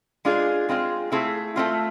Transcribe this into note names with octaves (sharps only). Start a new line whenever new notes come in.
G#3 D4 F4 G#4
G#3 C4 F4 G#4
A3 C4 E4 G#4
A3 C4 F4